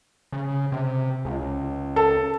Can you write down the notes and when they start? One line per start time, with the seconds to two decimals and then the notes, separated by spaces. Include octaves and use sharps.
0.32 C#3
0.72 C3
1.25 C#2
1.96 A4